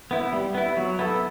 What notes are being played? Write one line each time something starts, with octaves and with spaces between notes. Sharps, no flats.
B3 E4
G3
B3 E4
F#3
B3 E4 A4